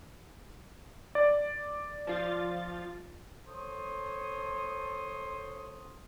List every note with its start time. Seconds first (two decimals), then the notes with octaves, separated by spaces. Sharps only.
1.15 D5
2.07 F3 F4 A6
3.46 A4 C5 C#5 C6 D#6